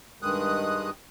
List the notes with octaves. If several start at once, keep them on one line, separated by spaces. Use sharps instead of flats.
G2 D#3 G#3 D#6 F#6